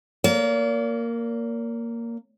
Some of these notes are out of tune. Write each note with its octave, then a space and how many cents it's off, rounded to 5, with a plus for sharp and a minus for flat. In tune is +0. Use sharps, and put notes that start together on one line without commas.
A#3 -5 D5 -45